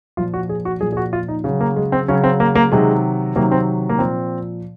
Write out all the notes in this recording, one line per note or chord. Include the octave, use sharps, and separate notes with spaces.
A#2 F3 F4
F#4
G#4
F#4
A#2 F3 G#4
G#4
F#4
F4
D#4
C#3 F#3
A#3
G#3
C4
C#3 F#3 C#4
C4
A#3
A#3
C3 D#3 F#3 G#3
C3 D#3 F#3 A#3
C4
A#3
A#2 F3 C4